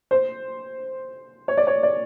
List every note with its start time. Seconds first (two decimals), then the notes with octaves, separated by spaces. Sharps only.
0.11 C5
1.48 C#5
1.57 D5
1.67 C#5
1.83 D5